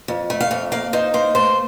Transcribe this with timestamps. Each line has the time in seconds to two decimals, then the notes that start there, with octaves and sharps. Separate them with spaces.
0.08 F2
0.30 A3
0.41 F5
0.51 F2
0.72 A#3 F5
0.93 D#4 C5
1.14 A#3 C5
1.35 A3 C5